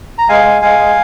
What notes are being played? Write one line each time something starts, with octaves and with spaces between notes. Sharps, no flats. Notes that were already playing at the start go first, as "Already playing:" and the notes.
A#5
G#3 F5 G#5
G#3
G#3 F5 G#5
G#3